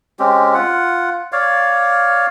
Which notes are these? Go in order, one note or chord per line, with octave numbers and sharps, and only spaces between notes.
G#3 C4 C#4 G4
F4 F#5
C#5 D5 F5